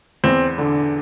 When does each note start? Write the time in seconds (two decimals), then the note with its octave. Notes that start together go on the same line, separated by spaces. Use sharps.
0.24 E2 C4
0.58 D3